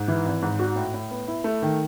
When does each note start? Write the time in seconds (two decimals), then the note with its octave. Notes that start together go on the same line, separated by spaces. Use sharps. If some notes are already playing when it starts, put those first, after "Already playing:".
Already playing: G#2
0.08 E3
0.25 G#1
0.42 G#2
0.59 F#4
0.76 A2
0.94 A2
1.11 B3
1.28 E4
1.44 A3
1.62 D#3